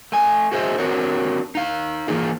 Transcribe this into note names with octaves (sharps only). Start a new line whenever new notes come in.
A3 G#5
F#4 G#4 C5 C#5 D#5 E5
C4 D4 F#4 G4 A#4 C#5
D#4 F5
E3 A#3 F4 G#4